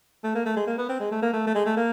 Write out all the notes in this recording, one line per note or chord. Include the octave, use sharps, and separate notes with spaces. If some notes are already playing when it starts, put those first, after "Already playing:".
A3
A#3
A3
G#3
A#3
B3
C4
G#3
A3
A#3
A3
A3
G#3
A3
A#3